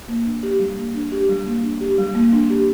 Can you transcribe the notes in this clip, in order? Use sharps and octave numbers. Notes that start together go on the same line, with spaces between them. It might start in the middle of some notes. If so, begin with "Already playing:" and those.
A#3
D4
G4
G3
A#3
D4
G4
G3
A#3
D4
G4
G3
A#3
D4
G4